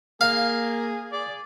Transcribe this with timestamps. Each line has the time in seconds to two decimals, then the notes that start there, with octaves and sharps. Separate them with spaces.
0.21 A#3 G#4 F5
1.12 G#4 D5